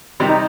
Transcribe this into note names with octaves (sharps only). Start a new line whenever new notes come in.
C3 D#3 G3
D#4